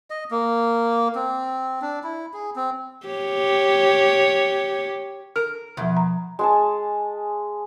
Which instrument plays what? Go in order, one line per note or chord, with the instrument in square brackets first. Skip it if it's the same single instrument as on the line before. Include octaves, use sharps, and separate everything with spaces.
[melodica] D#5
A#3
C4
D4
E4
G#4
C4
[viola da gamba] G4 C#5
[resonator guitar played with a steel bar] A#4 [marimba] F6
[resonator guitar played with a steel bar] E2 [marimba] B2 F3
[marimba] A#5
[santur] G#3 G#5 A5